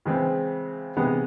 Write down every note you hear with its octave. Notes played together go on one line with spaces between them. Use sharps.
C#3 E3 G#3 C4
C3 E3 G#3 B3